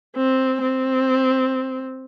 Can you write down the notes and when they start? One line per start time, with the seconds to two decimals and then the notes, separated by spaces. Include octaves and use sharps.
0.16 C4
0.61 C4